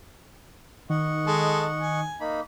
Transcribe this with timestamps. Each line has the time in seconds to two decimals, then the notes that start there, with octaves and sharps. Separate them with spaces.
0.90 D#3 D#5 F#5 C#6
1.27 G#3 A4
1.81 G#5
2.21 A#3 D#4 B5